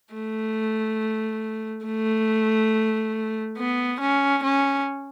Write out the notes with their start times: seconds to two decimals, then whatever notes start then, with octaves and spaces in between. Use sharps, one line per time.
0.14 A3
1.85 A3
3.58 B3
4.00 C#4
4.43 C#4